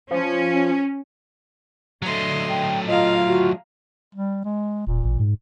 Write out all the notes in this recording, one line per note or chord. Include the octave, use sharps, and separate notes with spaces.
F3 C#4
D3 F#3 A3 D#5 C6
G5
F4 D#5 F5 A#5
F#4
G3
G#3
E1 A#2
A1
G#2